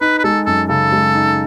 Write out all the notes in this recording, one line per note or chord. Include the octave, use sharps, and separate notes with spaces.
D#4 B4
B4
G#3 A4
F#2 A4
C#3 A4
G#3
D#4